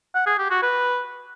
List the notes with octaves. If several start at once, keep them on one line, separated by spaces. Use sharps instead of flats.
F#5
G#4
G4
F#4
B4